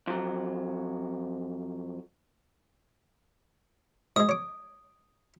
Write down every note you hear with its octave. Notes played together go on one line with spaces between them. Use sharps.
F2 F#3
G#2 G#3 D#6
C#5 D6